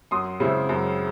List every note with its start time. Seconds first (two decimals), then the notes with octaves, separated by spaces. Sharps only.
0.11 F#2 C6 D#6
0.40 C#3 G#3 C4 E4
0.69 F#2